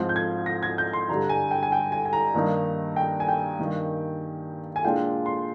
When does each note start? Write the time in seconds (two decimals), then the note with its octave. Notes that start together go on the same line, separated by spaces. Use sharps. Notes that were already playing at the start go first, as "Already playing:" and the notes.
Already playing: G#2 F3 C4 F4
0.09 G6
0.16 G#6
0.46 A#6
0.63 G#6
0.78 G6
0.93 C6
1.09 G2 D3 G3 A#5
1.29 G#5
1.51 G5
1.63 G#5
1.72 G5
1.92 G#5
2.06 G#5
2.13 A#5
2.34 G2 D#3 A#3 D#4
2.96 G5
3.20 G#5
3.28 G5
3.59 G2 D#3 A#3
4.76 G#5
4.84 A#2 G#3 D4 F4 G5
5.26 C6